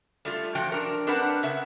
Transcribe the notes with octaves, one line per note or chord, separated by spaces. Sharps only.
G3 A3 F4
E3 F3 F#4 G5
F3 D4 A#4
C4 D4 A#4 B4 F#5 A5
C#3 E5 F#5